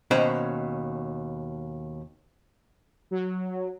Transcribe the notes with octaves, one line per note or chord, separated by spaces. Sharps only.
D#2 B2 C#4 C5 G5 B5
F#3